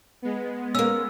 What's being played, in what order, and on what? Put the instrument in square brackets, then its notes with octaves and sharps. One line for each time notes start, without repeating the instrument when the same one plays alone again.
[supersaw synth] G#3 B3
[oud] A#3 C#4 [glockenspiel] E6